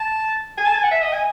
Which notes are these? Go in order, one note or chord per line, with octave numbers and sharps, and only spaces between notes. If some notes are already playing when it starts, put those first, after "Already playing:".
Already playing: A5
G#5
A5
G#5
F#5
E5
D#5
G#5